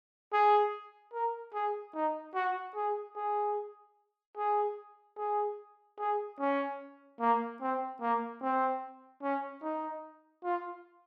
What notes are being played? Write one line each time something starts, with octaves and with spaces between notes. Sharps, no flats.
G#4
A#4
G#4
D#4
F#4
G#4
G#4
G#4
G#4
G#4
C#4
A#3
C4
A#3
C4
C#4
D#4
F4